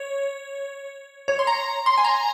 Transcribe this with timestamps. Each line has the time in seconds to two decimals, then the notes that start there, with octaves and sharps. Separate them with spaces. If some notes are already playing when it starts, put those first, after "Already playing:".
Already playing: C#5
1.28 C#5
1.39 C6
1.47 A#5
1.86 C6
1.98 G#5
2.05 A#5